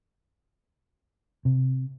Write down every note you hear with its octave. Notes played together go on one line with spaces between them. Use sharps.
C3